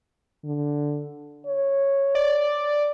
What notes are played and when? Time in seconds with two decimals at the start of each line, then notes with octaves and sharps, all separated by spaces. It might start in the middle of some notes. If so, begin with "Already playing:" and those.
0.45 D3
1.46 C#5
2.15 D5